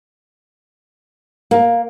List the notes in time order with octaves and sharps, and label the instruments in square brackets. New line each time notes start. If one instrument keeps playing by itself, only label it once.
[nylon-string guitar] A#3